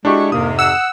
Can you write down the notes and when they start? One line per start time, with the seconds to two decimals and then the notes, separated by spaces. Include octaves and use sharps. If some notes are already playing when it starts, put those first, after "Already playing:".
0.05 G#3 D4 E4 F#4 G4 C#6
0.32 F2 G#2 C3 A#3 D#6
0.59 F#5 E6